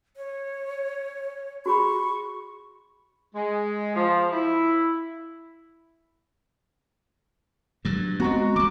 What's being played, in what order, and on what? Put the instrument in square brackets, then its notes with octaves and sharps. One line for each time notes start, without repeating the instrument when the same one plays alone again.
[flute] C#5
[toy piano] F#4 G#4 B5 [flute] C#6
[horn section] G#3
F3
E4
[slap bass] G2 F#3
[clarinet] G#3 [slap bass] B3 C4 [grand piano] F#4 A#5 C#6
[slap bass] F#3 G3 [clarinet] D6